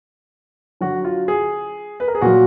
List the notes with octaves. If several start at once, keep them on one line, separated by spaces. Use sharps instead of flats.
D3 F#3 F#4
F4
G#4
B4
A#4
G#4
A#2 F#3 F#4